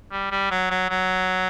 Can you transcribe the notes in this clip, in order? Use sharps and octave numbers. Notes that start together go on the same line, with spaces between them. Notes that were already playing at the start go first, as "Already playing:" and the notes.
G3
G3
F#3
F#3
F#3